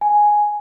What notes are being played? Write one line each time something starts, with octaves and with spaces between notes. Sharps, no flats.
G#5